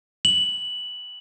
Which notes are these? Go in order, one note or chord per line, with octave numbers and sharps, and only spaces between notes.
F#7